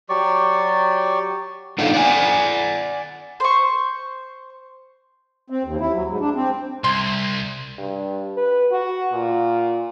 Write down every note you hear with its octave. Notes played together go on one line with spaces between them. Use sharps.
F#3 G4 D5 C#6
B3 D4 D#4 F4 A4 C#5
D5 F#5 G#5
C5 C#6
C4
D#2
E4
F#3
G#2
D4
C4
C2 C6
G2
B4
F#4
A#2